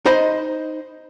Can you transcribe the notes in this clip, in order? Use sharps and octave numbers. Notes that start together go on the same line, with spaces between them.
D#4 C5 D#5 B5